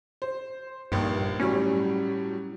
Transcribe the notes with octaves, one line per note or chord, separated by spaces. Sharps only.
C5
A#1 G2 D#3
A2 F#3 G3 C#4